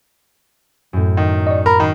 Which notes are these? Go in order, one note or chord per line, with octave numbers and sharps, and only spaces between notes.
F#2 A2
D#3
D5 D#5 C#6
A#4 A#5 B5
D#3 F#6 C7